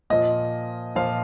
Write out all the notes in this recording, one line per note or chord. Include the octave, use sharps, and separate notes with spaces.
A#2 F3 D#5
A#2 F3 F5